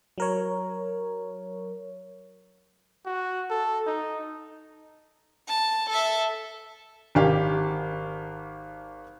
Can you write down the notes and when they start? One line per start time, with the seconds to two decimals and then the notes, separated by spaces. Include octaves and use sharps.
0.18 F#3 A#4 C#5
3.06 F#4
3.50 A4
3.87 D#4
5.48 A5
5.90 A4 E5
7.15 G#1 G4 F5